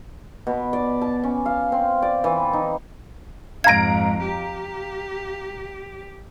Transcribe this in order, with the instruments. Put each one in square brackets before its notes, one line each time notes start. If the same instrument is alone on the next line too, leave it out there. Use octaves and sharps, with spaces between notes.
[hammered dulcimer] B2
D5
A5
C#4
F5
C4
D5
E3
D#4
[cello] F2 G#2 [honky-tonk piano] F5 A#5 D7 [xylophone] G#6 A#6
[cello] G4